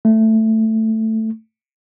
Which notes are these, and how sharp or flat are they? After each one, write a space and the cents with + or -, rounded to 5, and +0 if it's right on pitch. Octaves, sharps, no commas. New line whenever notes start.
A3 +5